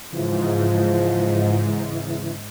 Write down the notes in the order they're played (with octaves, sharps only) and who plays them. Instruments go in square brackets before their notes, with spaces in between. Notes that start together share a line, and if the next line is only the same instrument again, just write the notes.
[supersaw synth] G#2 [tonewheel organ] C#3 E3 [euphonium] F3